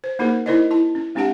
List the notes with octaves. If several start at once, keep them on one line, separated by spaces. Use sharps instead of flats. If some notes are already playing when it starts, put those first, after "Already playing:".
C5
A#3 D#4 F#4 G#4 A#4 C5
D#4 E4 A#4 C5 D5 D#5
E4 A5
C#4
G#3 C4 D4 G4 F#5 A5